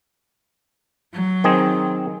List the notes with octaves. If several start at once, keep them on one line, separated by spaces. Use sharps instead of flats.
F#3
D#3 C4 G#4